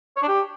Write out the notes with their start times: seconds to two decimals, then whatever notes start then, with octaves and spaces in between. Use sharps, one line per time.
0.17 C#5
0.22 D4
0.28 G4